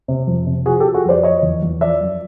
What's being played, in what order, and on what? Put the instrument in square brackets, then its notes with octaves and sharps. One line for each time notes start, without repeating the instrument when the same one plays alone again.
[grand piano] C3
F2
C3
F3 F#4 G#4
G4 A4
F3
F#4 G#4
F2 C5 D5
F3 C#5 D#5
E2
E2
F3 D5 E5
F#2